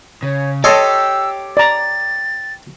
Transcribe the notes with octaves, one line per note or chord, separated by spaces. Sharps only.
C#3 C#5
G4 A4 C#5 D#5 A5 C6 E6
D5 A#5 A6